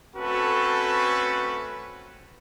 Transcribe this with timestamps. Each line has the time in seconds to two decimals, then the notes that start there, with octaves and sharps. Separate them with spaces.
0.16 A3 C4 C#4 F#4 A4 B4